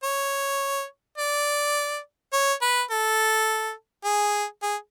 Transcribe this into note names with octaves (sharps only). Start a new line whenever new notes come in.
C#5
D5
C#5
B4
A4
G#4
G#4